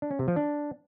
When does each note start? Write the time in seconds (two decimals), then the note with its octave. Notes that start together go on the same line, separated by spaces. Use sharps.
0.02 D4
0.11 C#4
0.19 C3
0.28 F3
0.36 D4